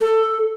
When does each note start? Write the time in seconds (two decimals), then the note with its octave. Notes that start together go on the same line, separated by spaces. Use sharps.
0.01 A4